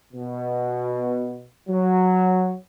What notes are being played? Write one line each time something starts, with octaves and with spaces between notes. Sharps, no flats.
B2
F#3